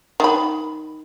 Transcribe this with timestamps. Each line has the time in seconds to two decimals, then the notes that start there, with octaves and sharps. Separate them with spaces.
0.20 D#3 B5